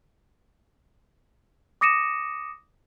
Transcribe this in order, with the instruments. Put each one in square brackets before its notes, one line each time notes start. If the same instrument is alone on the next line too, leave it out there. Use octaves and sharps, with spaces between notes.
[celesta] D6 D#6 A#6 C#7 D#7 E7